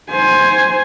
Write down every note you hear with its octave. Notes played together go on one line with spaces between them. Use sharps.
C5 G#5